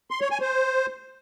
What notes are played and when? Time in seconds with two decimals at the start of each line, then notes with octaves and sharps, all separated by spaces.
0.11 C6
0.21 C#5
0.31 G#5
0.41 C5